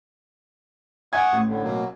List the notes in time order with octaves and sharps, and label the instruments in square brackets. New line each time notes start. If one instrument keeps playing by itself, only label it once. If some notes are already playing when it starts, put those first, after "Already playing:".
[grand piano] E5 G#5 G#6 [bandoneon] F#5 C#6 D#6
[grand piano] A1
[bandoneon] A2 D3
B2 F#3 A#3